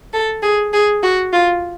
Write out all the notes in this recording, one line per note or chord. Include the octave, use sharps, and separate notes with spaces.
A4
G#4
G#4
F#4
F4